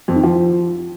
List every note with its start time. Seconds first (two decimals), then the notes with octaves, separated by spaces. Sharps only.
0.08 F2
0.16 D#3
0.23 F3